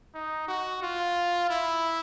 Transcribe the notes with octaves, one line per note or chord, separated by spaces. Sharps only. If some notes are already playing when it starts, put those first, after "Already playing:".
D#4
F#4
F4
E4